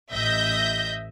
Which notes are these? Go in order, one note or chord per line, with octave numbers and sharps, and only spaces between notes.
A1 D#5 E5 G6 A#6